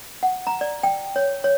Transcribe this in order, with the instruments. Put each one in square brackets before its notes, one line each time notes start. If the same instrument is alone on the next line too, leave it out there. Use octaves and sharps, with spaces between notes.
[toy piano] F#5
A#5
D5
G5
C#5
C#5